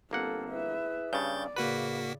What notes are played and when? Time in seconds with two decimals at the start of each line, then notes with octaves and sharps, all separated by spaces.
0.11 G1 A#3 C4 A4 F#5
0.50 E4 G#4 B4 E5
1.13 G2 C#3 D5 G6 A6
1.56 A2 C#3 A#3 F#4 B4 B6